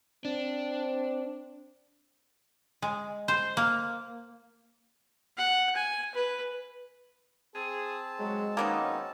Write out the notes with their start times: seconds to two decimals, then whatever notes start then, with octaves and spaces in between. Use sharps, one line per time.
0.25 C4 D4
2.82 G#3
3.28 C5
3.57 A#3
5.37 F#5
5.75 G#5
6.14 B4
7.55 C4 G#4 A5
8.20 F#3 G#3
8.57 D#3 F#3 A#3 B3 C#4 D#4